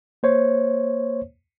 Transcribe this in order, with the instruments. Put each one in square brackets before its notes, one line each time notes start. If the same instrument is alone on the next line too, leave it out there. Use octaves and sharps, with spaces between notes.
[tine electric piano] A#3 C5 C#5